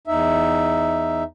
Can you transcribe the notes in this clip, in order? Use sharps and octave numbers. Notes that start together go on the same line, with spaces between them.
E2 D#4 E5